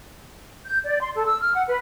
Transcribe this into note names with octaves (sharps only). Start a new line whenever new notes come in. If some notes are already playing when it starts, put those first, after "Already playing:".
G6
D5
C6
A4
E6
F6
F#5
B4